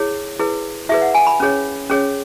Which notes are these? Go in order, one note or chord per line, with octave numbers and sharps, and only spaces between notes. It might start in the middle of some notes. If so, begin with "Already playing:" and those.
Already playing: E4 G#4 C#5
E4 G#4 B4
E4 G#4 B4 E5
F#5
G#5
B5
C#4 G#4 C#5
C#4 G#4 C#5